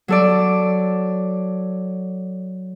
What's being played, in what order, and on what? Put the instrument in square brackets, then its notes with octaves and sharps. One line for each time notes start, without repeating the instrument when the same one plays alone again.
[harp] F#3 A4 D5